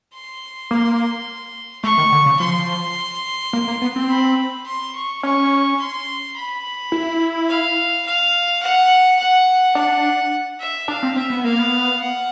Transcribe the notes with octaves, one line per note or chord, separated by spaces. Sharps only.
C6
A#3
A3 C#6
D#3
D3
C#3
F3 C6
A#3
A#3
B3
C4
B5
C6
C#6
C#4 C#6
C6
B5
E4
F5
F5
F#5
F#5
D4 F#5
E5
D4 F5
C4
C4 E5
B3
A#3 F5
B3
F#5